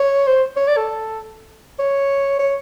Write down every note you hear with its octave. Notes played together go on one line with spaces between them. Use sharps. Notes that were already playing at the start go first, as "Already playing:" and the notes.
Already playing: C#5
C5
C#5
D5
A4
C#5
C#5